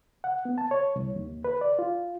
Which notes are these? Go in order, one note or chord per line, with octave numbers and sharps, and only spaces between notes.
F#5
B3
A5
C#5
C2
D#2
B4
D5
F4